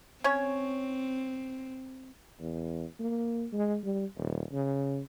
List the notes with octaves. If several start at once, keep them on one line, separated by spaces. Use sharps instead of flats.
C4 C#4 C#5
E2
A#3
G#3
G3
D#1
C#3